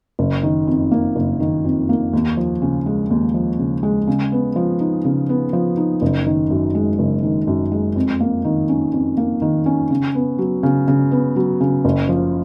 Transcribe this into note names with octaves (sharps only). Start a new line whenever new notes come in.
F#1
D#3
F2
A#3
F#1
D#3
F2
A#3
D#2
F3
C#3
G#3
D#2
F3
C#3
G#3
C#3
B3
F3
D#4
C#3
B3
F3
D#4
F#1
D#3
F#2
G#3
F#1
D#3
F#2
G#3
F2
A#3
D#3
C#4
F2
A#3
D#3
C#4
C#3
B3
F#3
C#3
C#3
B3
F#3
C#3
F#1
F3